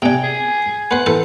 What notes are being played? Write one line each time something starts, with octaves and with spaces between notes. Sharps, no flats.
C3 D4 G5 G#5
G#4 G#5
B4 C5 F#5
E3 A4 B4 C5